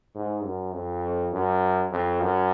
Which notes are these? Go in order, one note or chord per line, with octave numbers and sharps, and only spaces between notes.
G#2
F#2
F2
F#2
F2
F#2